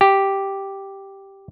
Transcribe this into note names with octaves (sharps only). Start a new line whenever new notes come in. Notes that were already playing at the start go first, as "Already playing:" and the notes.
G4